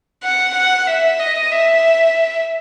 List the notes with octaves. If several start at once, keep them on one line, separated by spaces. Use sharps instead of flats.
F#5
F#5
E5
D#5
E5